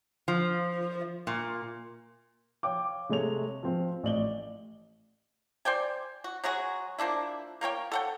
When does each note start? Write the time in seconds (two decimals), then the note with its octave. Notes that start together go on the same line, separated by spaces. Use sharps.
0.28 F3
1.27 A#2
2.63 C#5 F5 G5 D6
3.09 C3 G#3 A3 C#5 F7
3.63 F3 C4
4.03 A1 D5 F#7 G7
5.65 C5 D5 G5 G#5
6.24 F#4
6.44 F#3 G#3 F#4 G#4
6.99 F3 A#3 D4 E4
7.61 A#3 A#4 C#5 G5
7.92 A4 F#5 G5